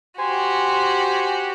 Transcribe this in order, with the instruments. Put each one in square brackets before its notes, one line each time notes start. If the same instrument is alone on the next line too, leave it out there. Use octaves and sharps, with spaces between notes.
[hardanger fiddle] F#4 G4 [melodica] C5 G#5